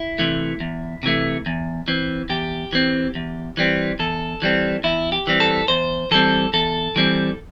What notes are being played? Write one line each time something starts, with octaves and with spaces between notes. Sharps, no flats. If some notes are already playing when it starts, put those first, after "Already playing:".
Already playing: E4
C3 E3 A3
E2
C3 E3 A3
E2
E3 C4
E2 G4
E3 C4
E2
E3 G3 C4
E2 A4
E3 G3 C4
E2 E4
G4
E3 G3 C4
A4
E2 C5
E3 G3 C4 A4
E2 A4
E3 G3 C4